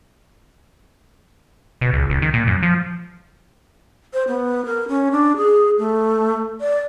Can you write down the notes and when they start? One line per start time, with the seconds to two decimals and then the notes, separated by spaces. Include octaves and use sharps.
1.81 B2
1.93 C#2
2.10 C#2
2.22 D#3
2.34 A#2
2.47 F#2
2.63 F3
4.13 C5
4.28 B3
4.66 A#4
4.89 C#4
5.12 D4
5.37 G#4
5.78 A3
6.61 D5